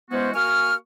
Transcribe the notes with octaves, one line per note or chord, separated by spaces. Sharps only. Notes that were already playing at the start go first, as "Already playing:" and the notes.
E3 G#3 B3 C#4 F#4 C5
A#3 F#4 G#5 C#6 F6